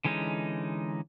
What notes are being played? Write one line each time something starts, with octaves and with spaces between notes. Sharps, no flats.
D3 E3 G#3 C#4 D#4